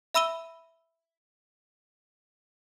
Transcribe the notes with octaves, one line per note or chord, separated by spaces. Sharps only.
E5 B5 E6 D#7 G7